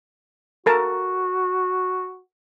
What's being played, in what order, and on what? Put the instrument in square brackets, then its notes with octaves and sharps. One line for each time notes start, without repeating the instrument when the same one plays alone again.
[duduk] F#4 [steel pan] A4 A#4 A5